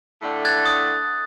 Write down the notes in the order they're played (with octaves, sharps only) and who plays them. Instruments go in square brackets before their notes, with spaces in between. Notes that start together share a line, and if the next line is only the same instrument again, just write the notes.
[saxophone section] A2 D3 A3
[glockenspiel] F#6 G#6 A6
D#6